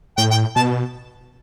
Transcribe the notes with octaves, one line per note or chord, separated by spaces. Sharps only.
A2 G5
G5
B2 A5